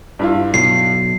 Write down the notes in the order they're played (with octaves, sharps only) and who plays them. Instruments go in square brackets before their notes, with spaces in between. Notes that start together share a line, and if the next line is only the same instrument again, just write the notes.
[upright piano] G2 E4 F4
[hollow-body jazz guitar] B1 [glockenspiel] C7